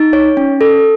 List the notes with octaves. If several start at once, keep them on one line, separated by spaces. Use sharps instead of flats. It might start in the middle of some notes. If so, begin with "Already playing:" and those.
Already playing: D#4
C#5
C#4
A4